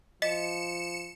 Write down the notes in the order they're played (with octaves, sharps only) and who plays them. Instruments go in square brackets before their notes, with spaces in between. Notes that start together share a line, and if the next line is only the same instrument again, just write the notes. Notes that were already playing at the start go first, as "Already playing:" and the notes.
[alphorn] F3 [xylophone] D#5 B6 [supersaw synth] C#7 E7